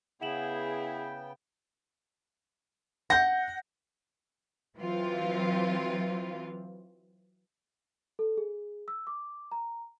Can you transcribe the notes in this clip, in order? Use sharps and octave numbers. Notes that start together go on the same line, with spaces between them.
C#3 B3 E4 G#4 F#5 G5 E7 F#7
F#5 G6 A#6
E3 F#3 C4 F4
A4
G#4
E6
D6
A#5